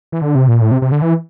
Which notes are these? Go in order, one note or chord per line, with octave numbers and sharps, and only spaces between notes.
E3
D3
C3
A#2
A2
C3
C3
D3
E3